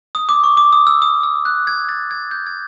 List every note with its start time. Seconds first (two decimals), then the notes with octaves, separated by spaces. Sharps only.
0.15 D#6
0.29 D6
0.44 C#6
0.57 D6
0.73 D#6
0.87 E6
1.02 D#6
1.23 E6
1.45 F#6
1.67 G#6
1.89 A6
2.11 G#6
2.31 G6
2.46 G#6